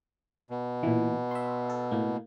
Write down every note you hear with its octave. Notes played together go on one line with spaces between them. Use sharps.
B2
A#2 E3
E5 C6
A4
A2 A#3